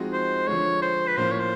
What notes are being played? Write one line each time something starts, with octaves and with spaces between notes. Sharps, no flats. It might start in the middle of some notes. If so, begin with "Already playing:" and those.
Already playing: F3 G#3 C4 D#4 F#4
C5
D3 F3 G#3 C#5
C5
B4
A2 F3 A#3 C#4 C5
C#5
C5